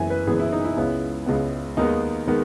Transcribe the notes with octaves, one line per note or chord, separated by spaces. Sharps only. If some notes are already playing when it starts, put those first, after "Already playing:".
Already playing: F#1 F#2 E3 G#3 B3 E5 G#5
B4
F#1 F#2 E3 G#3 B3 G#4
E4
D#4
E4
C#2 C#3 G#3 B3
C#2 C#3 G#3 B3
D#2 D#3 G#3 B3 D#4
D#3 G#3 B3